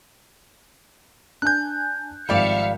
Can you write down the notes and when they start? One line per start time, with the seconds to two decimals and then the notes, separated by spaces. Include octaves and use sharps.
1.42 D4 G#5 F#6 G6
2.29 G#1 F3 G3 D5 E5 F5 C#7